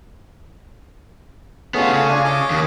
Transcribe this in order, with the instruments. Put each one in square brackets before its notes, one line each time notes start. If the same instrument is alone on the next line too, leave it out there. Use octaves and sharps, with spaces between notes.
[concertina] A3 C#4 G#4 [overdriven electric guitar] B3 F4
[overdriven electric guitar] C#3
[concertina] D4 F4 G#5
C#5 D#5 D6
[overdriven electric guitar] D#2